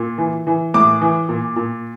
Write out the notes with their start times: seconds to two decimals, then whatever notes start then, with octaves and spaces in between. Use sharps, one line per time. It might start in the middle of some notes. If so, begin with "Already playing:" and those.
Already playing: A#2
0.18 E3
0.47 E3
0.74 A2 D6
1.01 E3
1.29 A#2
1.56 A#2